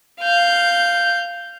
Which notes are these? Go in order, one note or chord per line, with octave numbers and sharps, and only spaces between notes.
F5 G6